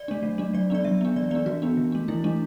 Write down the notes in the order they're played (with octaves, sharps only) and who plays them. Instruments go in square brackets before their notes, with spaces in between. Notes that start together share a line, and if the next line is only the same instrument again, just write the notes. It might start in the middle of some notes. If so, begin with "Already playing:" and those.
Already playing: [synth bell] D5
A3 D4
F#3
A3 D4
F#3 D5
B3 D4 D5
F#3 E5
B3 D4
E3 D5
B3 D4 D5
E3 F#4
B3 D4
E3
A3 D4
E3 E4
A3 D4